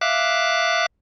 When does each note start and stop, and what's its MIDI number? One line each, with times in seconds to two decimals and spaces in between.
0.01 0.86 76
0.01 0.86 77
0.01 0.86 86
0.01 0.86 90